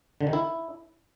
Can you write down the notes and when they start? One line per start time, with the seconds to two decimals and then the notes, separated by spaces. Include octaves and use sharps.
0.21 D3
0.27 D#3
0.33 E4